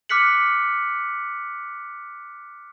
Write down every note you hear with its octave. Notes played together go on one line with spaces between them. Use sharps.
D6 F6 F#6 B6 C#7 F#7